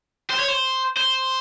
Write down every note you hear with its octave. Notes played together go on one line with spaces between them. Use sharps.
C5
C#5
C5
C5